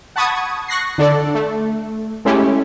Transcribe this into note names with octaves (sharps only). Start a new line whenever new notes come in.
F#5 A5 B5 C#6 D#6 G#6
C#6 F#6 A#6 C7
D3 D4 A4 D5
A3
G#3 A3 C#4 E4 G4